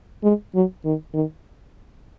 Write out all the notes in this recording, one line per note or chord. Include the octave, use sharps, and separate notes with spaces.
G#3
F#3
D#3
D#3